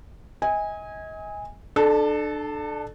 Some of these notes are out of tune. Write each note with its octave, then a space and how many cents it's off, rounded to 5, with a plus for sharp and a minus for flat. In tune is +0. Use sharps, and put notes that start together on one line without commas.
D#5 +35 G#5 -15
D4 +30 A4 -15